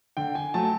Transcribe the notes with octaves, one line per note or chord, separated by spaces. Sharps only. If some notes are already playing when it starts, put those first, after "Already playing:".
D3 G5
G#5
F#3 A3 A5